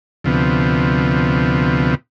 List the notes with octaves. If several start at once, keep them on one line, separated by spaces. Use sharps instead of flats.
D2 C3 F3 B3